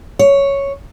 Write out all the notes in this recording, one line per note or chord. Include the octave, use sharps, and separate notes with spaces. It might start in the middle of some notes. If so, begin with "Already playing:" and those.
C#5